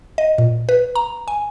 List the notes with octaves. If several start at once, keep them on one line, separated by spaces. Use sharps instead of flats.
D#5
A#2
B4
A#5
G#5